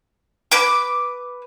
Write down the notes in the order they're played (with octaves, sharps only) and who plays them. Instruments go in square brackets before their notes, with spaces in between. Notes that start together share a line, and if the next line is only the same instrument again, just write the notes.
[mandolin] B4 D6